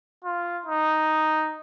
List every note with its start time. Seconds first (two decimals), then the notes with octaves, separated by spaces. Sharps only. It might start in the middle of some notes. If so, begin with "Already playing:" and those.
0.24 F4
0.66 D#4